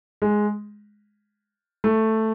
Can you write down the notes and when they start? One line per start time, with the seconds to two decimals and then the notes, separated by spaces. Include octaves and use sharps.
0.22 G#3
1.84 A3